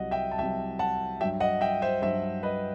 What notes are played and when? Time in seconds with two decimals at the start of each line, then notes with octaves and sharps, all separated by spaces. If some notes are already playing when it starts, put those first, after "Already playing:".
Already playing: C2 C3 F#3 D#5 F#5
0.11 E5 G5
0.31 A5
0.38 C2 C3 F#3 E5 G5
0.79 F#5 A5
1.21 G2 F#3 E5 G5
1.40 D#5 F#5
1.61 E5 G5
1.82 C5 E5
2.02 G2 F#3 C5 E5
2.43 B4 D#5